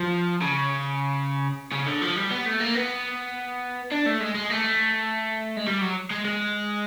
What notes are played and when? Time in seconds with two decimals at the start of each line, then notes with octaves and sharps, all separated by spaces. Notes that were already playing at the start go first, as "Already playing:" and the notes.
Already playing: F3
0.41 C#3
1.72 C#3
1.87 D3
2.02 F3
2.16 G3
2.31 B3
2.46 A3
2.60 A#3
2.75 B3
3.91 D4
4.06 A3
4.20 G#3
4.35 G#3
4.50 A3
5.57 G#3
5.67 G3
5.81 F#3
6.10 G#3
6.25 G#3